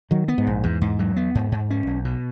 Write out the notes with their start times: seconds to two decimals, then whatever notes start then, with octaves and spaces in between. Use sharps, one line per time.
0.11 D#3 F#3
0.28 B3
0.38 G#2
0.47 A#1
0.64 E2 G#2
0.81 G#2
0.99 F#3
1.16 B3
1.35 G#2
1.52 G#2
1.70 C#4
1.87 B1
2.05 B2